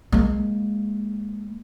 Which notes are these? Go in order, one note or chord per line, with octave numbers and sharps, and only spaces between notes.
G#3 A#3